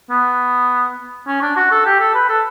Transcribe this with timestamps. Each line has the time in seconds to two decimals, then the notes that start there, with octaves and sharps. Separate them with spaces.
0.10 B3
1.27 C#4
1.42 D4
1.56 F#4
1.71 A4
1.86 G4
2.00 A4
2.15 B4
2.29 A4